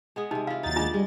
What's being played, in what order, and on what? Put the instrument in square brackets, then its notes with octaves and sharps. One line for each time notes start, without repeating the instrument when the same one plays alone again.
[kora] G#3 B3 G#4
[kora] C3 G#3 [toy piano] D#4
[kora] E4 F4 [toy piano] F5
[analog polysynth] D#2 A6 [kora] F#3 D#4
[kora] G#3 D5 [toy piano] D4 F4
[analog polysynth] G3 [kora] G#3